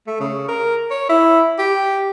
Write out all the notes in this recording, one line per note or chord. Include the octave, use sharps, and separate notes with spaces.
A3
C#3
A#4
C#5
E4
G4